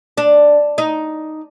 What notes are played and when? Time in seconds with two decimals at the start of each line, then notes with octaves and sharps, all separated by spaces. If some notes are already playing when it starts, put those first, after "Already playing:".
0.17 D4
0.78 D#4